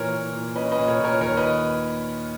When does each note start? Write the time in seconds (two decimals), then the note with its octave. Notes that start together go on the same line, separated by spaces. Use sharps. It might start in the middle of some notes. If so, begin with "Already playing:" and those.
Already playing: A#2 E3 A#4 C#5
0.12 A#2
0.34 A#2
0.56 C#4 B4 D#5
0.72 B4 D#5
0.78 A#2
0.88 A#4 C#5
1.00 A#2 A#4 C#5
1.21 D#2 A#4 C#5
1.37 B4 D#5